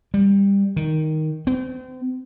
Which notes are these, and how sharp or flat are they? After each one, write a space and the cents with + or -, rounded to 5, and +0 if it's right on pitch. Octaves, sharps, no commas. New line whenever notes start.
G3 +20
D#3 +5
C4 -35